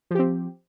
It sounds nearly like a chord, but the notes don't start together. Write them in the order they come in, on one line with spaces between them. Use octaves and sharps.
F3 G4 C4